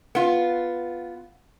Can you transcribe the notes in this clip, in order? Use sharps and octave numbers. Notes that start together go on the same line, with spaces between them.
B3 F4